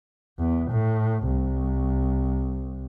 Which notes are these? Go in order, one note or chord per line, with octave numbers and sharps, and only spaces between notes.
E2
A2
C2